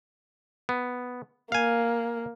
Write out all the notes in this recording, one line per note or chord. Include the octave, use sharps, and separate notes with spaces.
B3
A#3 F5 G#5